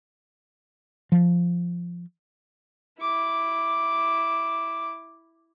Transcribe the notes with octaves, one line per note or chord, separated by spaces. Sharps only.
F3
E4 D6